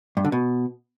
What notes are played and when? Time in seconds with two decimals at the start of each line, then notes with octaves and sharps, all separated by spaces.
0.17 G2
0.25 D3
0.32 B2